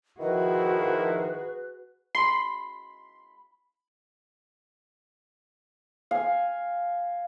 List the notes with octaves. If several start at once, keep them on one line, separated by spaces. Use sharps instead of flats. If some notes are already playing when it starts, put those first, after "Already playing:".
D#3 F3 E4 F#4 G#4 B4
B5 C6
F5 G#5